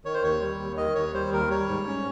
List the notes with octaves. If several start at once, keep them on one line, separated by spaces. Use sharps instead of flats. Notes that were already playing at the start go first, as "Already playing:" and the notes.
D#3 C#5
C5
D#2 C#5
G3
D#2
D#3 D#5
D#2 C#5
G3 C5
D#2 A#4
G3 C#5
G#2
C#4